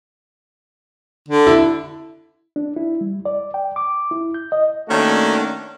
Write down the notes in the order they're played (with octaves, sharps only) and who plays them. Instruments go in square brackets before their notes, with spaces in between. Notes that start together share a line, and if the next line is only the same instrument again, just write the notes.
[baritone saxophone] D3
[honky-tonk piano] E4
[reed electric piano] D4
E4
G3
D5
G5
D6
E4
G6
D#5
[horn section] D#3 A3 A#3 C#4 D4 F#4